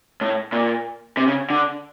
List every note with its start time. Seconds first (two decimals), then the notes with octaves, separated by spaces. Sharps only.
0.21 A2
0.52 A#2
1.17 C3
1.28 C#3
1.50 D3